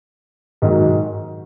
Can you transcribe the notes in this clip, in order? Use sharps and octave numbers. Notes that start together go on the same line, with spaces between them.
G#2 D#3 F#3